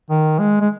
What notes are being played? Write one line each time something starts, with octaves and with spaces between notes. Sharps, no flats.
D#3
G#3
G#3